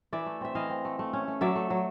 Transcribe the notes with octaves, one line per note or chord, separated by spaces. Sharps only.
E3 D5 E5
A3
C4 E5
E3 D#5 F5
C4
A3
A3
C#4
A3
F#3 D5 E5
A3
F#3